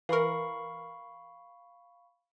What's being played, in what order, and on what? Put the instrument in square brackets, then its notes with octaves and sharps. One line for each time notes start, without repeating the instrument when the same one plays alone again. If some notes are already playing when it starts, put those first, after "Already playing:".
[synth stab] E3 A#4 [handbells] F5 B5 C#6